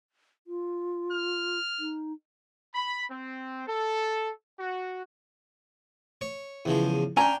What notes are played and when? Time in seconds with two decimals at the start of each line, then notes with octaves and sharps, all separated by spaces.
0.47 F4
1.12 F6
1.79 D#4
2.75 B5
3.11 C4
3.68 A4
4.60 F#4
6.21 C#5
6.65 E2 C#3 F3
7.17 C#4 D4 G5 G#5 A#5